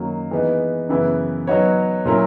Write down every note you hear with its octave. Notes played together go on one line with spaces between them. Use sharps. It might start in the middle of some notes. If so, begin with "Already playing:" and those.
Already playing: F#2 D#3 F#3 A#3
E3 G#3 B3 D#4
F#2 C#3 E3 B3 E4
F#3 B3 D#4 F#4 C#5
A#2 F#3 C#4 E4 A#4